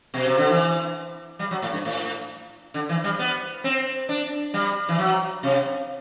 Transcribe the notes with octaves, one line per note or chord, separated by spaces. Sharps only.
B2
C3
D3
E3
G3
F#3
A2
G2
A2
D3
E3
G3
B3
C4
D4
G3
E3
F#3
C3